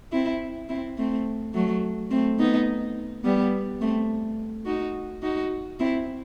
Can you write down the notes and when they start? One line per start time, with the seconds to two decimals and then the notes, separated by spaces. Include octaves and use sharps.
0.12 C4 E4
0.69 C4 E4
0.98 A3 C4
1.54 F#3 A3
2.11 A3 C4
2.39 B3 D#4
3.24 G3 B3
3.81 A3 C4
4.66 D#4 F#4
5.22 D#4 F#4
5.80 C4 E4